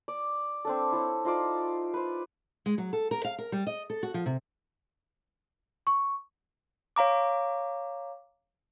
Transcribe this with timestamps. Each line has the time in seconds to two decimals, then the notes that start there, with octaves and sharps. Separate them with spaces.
0.08 D5
0.65 C4 D4 A4
0.92 E4 A4 C#5
1.25 D#4 F4 C5 D5
1.94 B4 C5
2.66 G#3
2.78 F#3
2.93 A4
3.11 A#4
3.24 F5
3.38 A#4
3.52 G3
3.67 D#5
3.90 A4
4.03 F#4
4.14 F3
4.26 C3
5.87 C#6
6.96 C#5 F5 A#5 D6